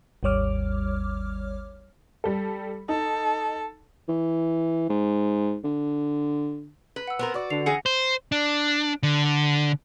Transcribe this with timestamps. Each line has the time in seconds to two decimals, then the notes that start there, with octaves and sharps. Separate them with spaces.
0.23 G#1 D#2 G3 C#5 D6 F6
2.24 G3 A4
2.89 D#4 A4
4.08 E3
4.90 G#2
5.64 D3
6.96 B4
7.08 F#5 E6
7.19 B3 C4 A#4
7.34 F#4 D5
7.50 D3 C7 F7
7.66 E3 G#4 F#5 G#5 A#6
7.86 C5
8.32 D4
9.03 D3